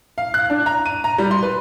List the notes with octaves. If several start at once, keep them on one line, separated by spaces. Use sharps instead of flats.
F5
F#6
D4
A#5
D#7
A#5
G3
C6
B4